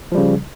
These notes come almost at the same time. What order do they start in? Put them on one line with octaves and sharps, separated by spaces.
F3 G3 C#3